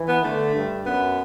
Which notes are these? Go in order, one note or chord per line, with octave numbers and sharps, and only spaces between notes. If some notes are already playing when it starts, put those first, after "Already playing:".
Already playing: E3
B3
D3 A3
G2
F#2 B3